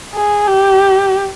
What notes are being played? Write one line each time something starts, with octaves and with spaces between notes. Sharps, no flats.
G#4
G4